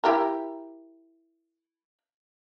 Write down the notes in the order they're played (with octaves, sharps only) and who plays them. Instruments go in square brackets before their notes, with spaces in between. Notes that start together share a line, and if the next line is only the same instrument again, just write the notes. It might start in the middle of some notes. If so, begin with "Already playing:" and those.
[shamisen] E4 G4 A#4